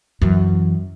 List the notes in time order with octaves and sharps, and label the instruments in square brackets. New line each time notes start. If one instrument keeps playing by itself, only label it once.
[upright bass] F#2 E3